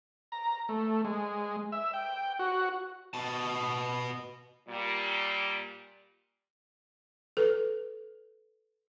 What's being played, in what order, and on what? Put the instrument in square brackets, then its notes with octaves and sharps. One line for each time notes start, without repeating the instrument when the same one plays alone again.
[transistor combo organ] A#5
A3
G#3
E5
G5
F#4
[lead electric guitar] B2 A5
[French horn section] A#2 G3
[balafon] A4 B4